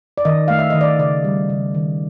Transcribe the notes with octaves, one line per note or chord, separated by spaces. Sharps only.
D5
D#3 D#5
A3 F5
E5
D#3 D#5
D5
C#3 D5
G3
C#3
D#3